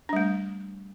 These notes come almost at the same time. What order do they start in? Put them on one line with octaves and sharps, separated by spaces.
D4 G3 A3